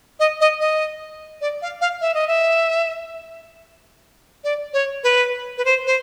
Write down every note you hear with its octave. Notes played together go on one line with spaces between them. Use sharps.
D#5
D#5
D#5
D5
F5
F5
E5
D#5
E5
D5
C#5
B4
B4
C5
C5